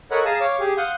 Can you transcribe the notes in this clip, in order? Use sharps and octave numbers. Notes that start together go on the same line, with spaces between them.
A4 A#4 C#5 D#5 F#5 B5
G#4 F5 A5 A#5 D#6
C#5 F5 D6
G4 G#4
F5 F#5 C6 D#6 G6